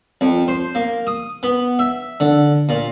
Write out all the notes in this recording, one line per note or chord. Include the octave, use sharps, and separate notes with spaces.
F2
C5
A#3
D#6
B3
E5
D3
A#2